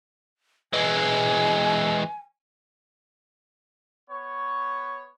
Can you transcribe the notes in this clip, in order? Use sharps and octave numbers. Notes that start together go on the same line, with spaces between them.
E3 G#3 G#5
B3 C#5